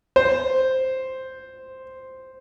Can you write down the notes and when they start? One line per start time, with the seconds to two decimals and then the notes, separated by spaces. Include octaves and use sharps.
0.16 C5